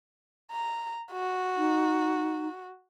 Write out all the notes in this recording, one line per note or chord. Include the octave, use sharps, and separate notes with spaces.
A#5
F#4
D#4